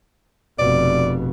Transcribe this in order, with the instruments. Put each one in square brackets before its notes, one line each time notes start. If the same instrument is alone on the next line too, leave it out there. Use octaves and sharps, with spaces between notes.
[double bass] F1 B2 [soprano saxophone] D5